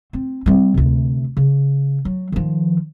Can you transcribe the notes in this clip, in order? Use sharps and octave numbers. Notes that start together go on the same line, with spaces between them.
C4
G3 C4
D2 C3
C#3
F#3
D#3 F3